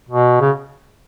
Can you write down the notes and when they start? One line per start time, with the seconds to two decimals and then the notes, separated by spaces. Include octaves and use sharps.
0.09 B2
0.41 C#3